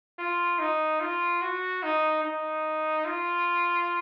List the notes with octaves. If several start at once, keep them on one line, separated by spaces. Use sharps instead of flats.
F4
D#4
F4
F#4
D#4
D#4
F4